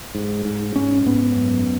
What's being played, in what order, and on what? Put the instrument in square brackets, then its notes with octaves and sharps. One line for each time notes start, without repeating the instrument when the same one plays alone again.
[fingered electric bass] G#2
G#2
G#2 C#4
G#2 B3
F#2